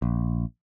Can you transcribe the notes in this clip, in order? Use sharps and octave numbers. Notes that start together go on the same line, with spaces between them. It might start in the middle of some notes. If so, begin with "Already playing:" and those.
A#1